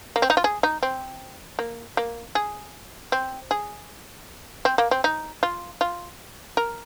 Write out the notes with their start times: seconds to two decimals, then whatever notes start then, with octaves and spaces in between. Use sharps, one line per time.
0.16 A#3
0.22 C4
0.30 D#4
0.37 F4
0.44 G#4
0.63 D#4
0.83 C4
1.59 A#3
1.97 A#3
2.35 G#4
3.12 C4
3.51 G#4
4.65 C4
4.78 A#3
4.91 C4
5.04 D#4
5.43 F4
5.81 F4
6.57 A#4